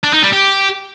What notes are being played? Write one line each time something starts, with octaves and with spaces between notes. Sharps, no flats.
D4
D#4
G3
G4